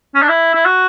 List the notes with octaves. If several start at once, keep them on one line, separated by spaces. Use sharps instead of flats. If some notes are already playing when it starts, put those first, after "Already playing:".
C#4
D4
E4
E4
F#4